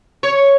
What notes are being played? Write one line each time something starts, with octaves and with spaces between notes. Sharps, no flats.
C#5